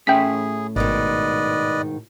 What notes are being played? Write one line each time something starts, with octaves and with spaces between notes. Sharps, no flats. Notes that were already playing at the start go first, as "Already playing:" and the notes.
A2 C#4 G#4 E5 G5 B6
G#1 G#2 B2 D#3 B4 D5 D#5